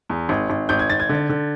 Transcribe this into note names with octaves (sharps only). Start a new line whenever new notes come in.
E2
G#1
G#1
G#1 G6
G#6
G#1 A6
G#6
D3
D3